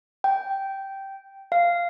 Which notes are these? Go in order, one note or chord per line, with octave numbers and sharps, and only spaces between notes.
G5
F5